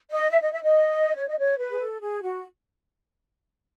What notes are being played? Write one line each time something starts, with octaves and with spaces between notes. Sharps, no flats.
D#5
E5
D#5
E5
D#5
C#5
D#5
C#5
B4
G#4
A4
G#4
F#4